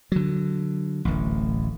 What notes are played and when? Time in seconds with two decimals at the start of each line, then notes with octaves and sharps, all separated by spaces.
0.12 D3 F#3
1.05 D1 A1